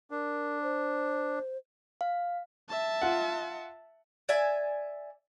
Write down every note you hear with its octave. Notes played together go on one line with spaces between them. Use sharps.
D4 A#4
C5
F5
E5 A5
F4 F#5
D5 E5 G#5